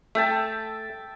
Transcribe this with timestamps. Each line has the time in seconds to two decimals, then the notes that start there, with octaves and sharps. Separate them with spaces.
0.15 A3 E5 G5 A5